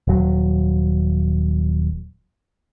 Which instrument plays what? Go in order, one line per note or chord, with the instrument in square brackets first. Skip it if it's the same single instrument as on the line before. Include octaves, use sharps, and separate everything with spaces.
[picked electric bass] D#1 F#3